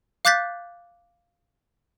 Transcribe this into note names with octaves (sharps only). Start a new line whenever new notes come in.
F5 D6 F#6 G6 A6 B6